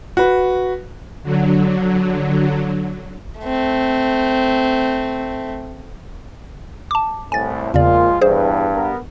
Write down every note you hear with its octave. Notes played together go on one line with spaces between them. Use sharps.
F#4 B4
D3 F#3
A3 C4
A5 D6
C2 A2 G#5 A6
E2 A#2 C#3 F3 G#3 F4 D5
E2 G2 G#4 C5
B3 A#4